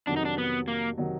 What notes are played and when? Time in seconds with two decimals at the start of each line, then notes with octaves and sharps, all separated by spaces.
0.07 F2 C3 D#3 F#3 D4
0.16 D#4
0.25 D4
0.38 B3
0.68 A#3
0.98 C3 D#3 F#3